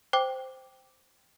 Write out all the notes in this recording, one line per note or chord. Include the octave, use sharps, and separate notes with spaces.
C5 G5 D6